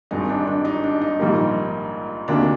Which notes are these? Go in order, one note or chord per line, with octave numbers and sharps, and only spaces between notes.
G#1 G2 D#3 G#3 D#4
D4
D4
D#4
D4
D#4
A#1 G#2 D#3 G3 A#3
D2 C3 D#3 A#3 D4